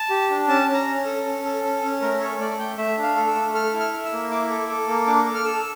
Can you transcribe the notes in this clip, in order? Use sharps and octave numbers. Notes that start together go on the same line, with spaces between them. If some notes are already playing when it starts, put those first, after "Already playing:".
Already playing: A5
G4
D4
C#4 A5
C#4
A#5
C#4
A4
C#4
A4
C#4
C#4
A3 A#4
A4 C#5
A3 D5
A3 G5
A3 E5
D4
F5
A4
E6
A3
A4 F6
E4
F6
E4
E6
A#3
E4 D6
A4
A4
A#3
D4 D6
A4
F6
A4 E6